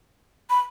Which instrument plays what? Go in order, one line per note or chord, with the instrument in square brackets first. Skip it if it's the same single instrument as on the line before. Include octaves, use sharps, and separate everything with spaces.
[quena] B5